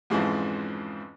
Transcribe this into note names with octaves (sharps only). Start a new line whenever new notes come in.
F2 G#2 C#3 E3 F3